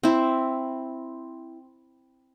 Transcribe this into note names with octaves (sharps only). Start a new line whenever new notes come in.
C4 E4